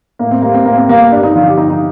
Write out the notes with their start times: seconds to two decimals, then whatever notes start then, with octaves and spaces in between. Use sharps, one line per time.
0.19 A2 A#3
0.31 C4
0.42 G3 A#3
0.54 C4
0.65 A2 A#3
0.77 C4
0.89 G3 A#3
1.12 G2 D4
1.23 D#4
1.35 D3 F3 F4
1.47 G4
1.58 G2 D#4
1.70 D#4